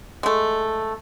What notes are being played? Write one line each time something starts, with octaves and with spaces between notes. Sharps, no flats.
G#3 A3